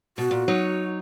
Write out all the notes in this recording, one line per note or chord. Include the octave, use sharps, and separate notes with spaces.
B2 F#4
A#2
F#3 D#4 C#5